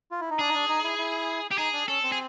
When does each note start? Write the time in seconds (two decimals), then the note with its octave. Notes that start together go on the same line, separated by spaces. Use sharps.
0.11 F4
0.21 E4
0.30 D#4
0.39 D4 G#4
0.49 D#4
0.54 D4
0.69 D#4
0.84 E4
0.98 E4
1.51 G4
1.58 D#4 G#4
1.73 D4
1.88 C#4 A4
2.03 C4
2.12 G#4